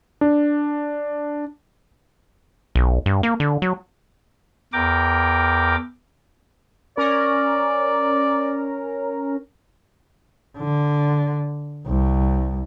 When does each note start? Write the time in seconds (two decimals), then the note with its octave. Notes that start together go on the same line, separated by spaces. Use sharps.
0.21 D4
2.75 B1
3.06 G2
3.23 A#3
3.40 D3
3.62 F#3
4.73 E2 A#4 G5 D6
6.97 C#4 A#4 D5
10.58 D3
11.87 C2